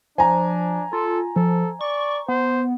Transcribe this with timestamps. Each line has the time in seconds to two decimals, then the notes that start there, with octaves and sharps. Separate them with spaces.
0.18 F3 D4 G#5 A#5
0.93 F4 A4
1.36 F3 A4
1.81 D5 C#6
2.28 B3 C5